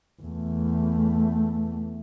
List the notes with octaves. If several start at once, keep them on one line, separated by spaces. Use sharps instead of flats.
E2 A3